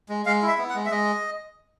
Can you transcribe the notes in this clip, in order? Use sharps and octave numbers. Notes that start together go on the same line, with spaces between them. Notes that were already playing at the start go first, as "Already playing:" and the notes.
G#3
G#3 F5
E4
E5
B3
F#5
G#3
E5
G#3 D#5